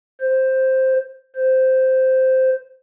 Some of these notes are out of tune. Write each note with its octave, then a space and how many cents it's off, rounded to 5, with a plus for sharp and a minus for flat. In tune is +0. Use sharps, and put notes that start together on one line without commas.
C5 +5
C5 -5